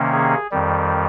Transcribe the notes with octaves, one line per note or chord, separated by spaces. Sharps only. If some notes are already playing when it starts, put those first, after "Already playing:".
Already playing: C3 D#3 A#3 C#4
G#4
F2 D#3 G3